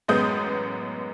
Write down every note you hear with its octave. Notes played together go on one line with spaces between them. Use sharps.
A1 F#2 G#3 B3 D#6 G6